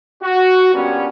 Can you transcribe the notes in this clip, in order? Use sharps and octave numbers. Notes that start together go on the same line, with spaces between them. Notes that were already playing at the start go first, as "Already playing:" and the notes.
F#4
G2 A#2 G3 B3 C#4